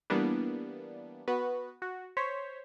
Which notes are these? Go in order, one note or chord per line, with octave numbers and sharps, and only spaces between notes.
E3 G3 A#3 B3 D4
B3 F#4 B4
F#4
C5 C#5 B6